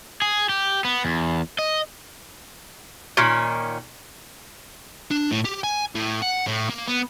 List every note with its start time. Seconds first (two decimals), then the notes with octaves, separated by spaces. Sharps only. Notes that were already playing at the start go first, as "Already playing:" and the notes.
0.22 G#4
0.49 G4
0.85 B3
1.05 E2
1.59 D#5
3.17 A#2 D#3 C#4
5.11 D4
5.31 A2
5.45 G4
5.64 G#5
5.95 A2
6.22 F#5
6.47 A2
6.69 A#3
6.88 B3